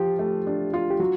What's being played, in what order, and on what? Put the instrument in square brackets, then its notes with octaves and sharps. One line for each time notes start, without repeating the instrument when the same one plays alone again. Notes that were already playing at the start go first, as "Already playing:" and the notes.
Already playing: [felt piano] F3 F4 [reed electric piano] G4
[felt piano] A3
D4
F4
[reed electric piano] G4
[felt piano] F#3 [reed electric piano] F#4